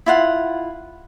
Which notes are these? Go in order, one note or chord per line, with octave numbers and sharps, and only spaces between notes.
E4 F4 F#5